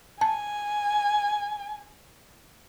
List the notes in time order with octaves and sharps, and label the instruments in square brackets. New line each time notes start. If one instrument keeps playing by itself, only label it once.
[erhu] G#5 [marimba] A5